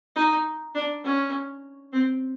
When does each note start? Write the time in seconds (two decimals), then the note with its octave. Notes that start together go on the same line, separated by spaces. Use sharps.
0.16 D#4
0.75 D4
1.04 C#4
1.93 C4